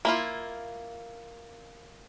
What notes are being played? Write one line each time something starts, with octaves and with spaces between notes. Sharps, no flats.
A#3 E4 F4